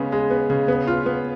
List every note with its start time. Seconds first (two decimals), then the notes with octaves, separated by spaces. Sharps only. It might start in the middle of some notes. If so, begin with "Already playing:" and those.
Already playing: C#3 G#3 B3
0.12 G#3
0.30 B3
0.50 C#3
0.68 B3
0.87 F4
1.06 B3